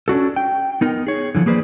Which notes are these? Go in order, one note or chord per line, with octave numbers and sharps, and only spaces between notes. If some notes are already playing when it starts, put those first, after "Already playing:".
C#4 D4 F#4 A4
G5
B3 D#4 A#4
G#4 C#5
D3 E3 F3
A#3 G#4 B4 C5 D5